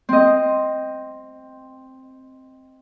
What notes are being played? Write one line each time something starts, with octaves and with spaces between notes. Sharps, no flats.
C4 D#5